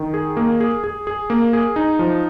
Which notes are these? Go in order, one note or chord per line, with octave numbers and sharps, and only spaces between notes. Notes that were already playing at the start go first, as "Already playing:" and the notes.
Already playing: D#3
G#4
A#3
G#4
G#4
G#4
A#3
G#4
D#4
F3